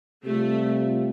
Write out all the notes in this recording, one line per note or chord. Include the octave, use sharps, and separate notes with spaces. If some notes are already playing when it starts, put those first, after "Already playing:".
C3 G3 A3 F4